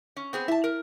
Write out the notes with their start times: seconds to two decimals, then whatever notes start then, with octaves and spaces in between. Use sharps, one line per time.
0.16 C#4
0.33 B3 C4 G#4
0.48 E4 E5 A5
0.64 A#4